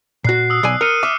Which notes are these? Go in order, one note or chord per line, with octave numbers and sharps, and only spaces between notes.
A#2 F#4 F#6 C7
D#6 E6
B1 D5 G#5
A#4 F6 C#7 D#7
E5 D6